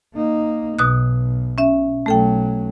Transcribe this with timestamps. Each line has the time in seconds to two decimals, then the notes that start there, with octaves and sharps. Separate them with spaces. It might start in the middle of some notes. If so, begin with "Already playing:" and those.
0.14 A#3 D#4
0.79 B1 B2 D#6 F#6
1.58 C#4 E5
2.06 B1 F#3 A3 A4 G5